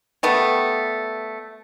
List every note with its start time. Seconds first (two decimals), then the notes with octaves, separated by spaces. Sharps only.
0.23 G3 A3 B3